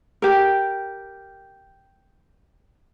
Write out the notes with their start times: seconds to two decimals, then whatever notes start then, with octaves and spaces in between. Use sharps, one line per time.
0.22 G4 A#4